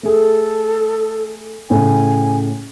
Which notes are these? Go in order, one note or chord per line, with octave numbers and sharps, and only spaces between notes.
A3 G#4 A4
A2 C#3 G#5